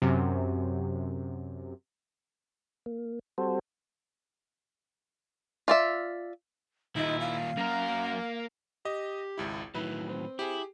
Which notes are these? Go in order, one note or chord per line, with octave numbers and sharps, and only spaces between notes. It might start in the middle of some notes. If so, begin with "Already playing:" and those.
F#2 C3
A#3
G3 C4 F#4 A4 C5
F4 D5 E5
D#2 A#2 D#4 E4
F5
F#2 A#3 A#4
G4 D#5
G#1 C#2 E4
A2 D#3 F#3 E4 B4
C4
E4 G4 G#4